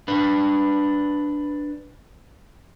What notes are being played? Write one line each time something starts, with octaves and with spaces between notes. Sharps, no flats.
D4 B4